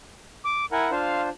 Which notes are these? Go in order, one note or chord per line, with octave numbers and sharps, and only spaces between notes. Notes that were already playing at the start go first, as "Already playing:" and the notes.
D6
E4 A#4 F#5 G#5
D4 F4 C5 F5